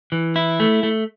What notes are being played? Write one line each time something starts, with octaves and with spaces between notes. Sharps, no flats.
E3
E4
A3
A3